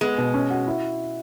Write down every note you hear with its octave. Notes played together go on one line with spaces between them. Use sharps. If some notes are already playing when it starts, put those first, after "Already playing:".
G#3 B3
B2
C#4
F#4
E4